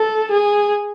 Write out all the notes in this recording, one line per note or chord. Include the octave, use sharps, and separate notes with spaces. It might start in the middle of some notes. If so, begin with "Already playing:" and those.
Already playing: A4
G#4